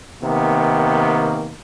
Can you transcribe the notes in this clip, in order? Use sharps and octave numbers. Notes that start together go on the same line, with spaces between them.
C3 D#3 A#3 B3